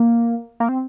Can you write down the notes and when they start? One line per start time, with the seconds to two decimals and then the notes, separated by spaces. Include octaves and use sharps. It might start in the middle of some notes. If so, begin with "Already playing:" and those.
Already playing: A#3
0.60 A#3
0.69 C4